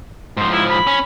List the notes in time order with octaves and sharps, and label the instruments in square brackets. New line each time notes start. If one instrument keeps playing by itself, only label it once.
[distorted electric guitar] G#2 F3 [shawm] C5
[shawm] E4
B5
[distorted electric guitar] C#4